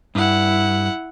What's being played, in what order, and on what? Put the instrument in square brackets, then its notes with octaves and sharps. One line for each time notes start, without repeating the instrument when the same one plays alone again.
[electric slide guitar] G2 [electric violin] E4 F#5